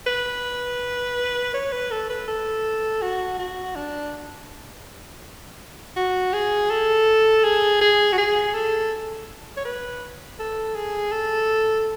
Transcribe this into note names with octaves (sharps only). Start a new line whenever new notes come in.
B4
C#5
B4
A4
B4
A4
F#4
F#4
D4
F#4
G#4
A4
G#4
G#4
F#4
G#4
A4
C#5
B4
A4
G#4
A4